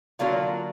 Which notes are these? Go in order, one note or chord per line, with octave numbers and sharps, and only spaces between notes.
D3 F#3 A#3 D4 F4